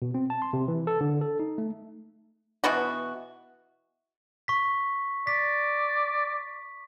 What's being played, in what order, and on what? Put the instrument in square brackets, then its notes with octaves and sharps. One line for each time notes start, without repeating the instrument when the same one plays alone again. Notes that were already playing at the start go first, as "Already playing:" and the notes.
[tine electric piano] B2
C4
A5
C6
C3
E3
A4
D3
A4
D#4
A3
[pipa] B2 E3 B3 F#4
[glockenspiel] C#6 B6
[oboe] D5 [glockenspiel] B6